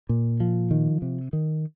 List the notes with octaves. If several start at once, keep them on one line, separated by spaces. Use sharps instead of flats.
A#2
F3
D#3
C3
D#3